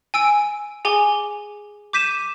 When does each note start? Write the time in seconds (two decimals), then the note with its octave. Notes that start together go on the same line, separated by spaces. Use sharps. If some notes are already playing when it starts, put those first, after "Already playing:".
0.14 G#5 E6 D7
0.85 G#4 G#5 D6 G7
1.93 D6 G6 B6 D#7 E7